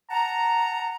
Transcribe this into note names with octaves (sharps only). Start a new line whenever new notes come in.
F#5 A5 A#5